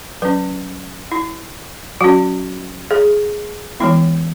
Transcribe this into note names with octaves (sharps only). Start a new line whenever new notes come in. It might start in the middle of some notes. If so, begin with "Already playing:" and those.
F#3 C#4 B4
E4
F#3 C#4 F#4
G#4
E3 G#3 B3 E4